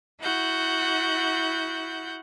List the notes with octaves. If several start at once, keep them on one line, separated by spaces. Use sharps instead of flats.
E4 F#4 F#5 G6